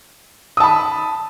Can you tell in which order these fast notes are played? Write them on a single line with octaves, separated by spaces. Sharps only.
D#6 A5 B5